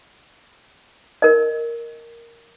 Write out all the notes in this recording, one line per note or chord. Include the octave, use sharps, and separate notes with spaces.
A#4 D#5